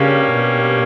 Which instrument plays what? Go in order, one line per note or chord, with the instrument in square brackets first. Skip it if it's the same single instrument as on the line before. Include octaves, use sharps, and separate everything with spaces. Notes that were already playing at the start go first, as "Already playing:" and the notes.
Already playing: [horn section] G2 G3 A#3 C#4 [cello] C#3
[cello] B2